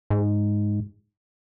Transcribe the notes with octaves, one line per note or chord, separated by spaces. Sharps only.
G#2